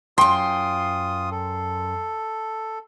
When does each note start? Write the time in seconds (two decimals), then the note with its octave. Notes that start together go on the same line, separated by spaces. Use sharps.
0.18 F#2 F4 G5 C6 D#6
1.31 A4